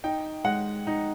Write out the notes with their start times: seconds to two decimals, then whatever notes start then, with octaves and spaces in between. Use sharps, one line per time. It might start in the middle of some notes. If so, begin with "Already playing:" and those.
0.04 D#4 G5
0.44 G#3 F#5
0.87 D#4